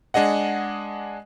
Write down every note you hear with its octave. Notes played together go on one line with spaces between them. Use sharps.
G#3 D4 G#4 D#5 F#5